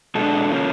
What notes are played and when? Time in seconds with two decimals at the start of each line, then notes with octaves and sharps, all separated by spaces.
0.15 B2 G#3 B3 D4 A4
0.50 C#3 F3 A#3 C#4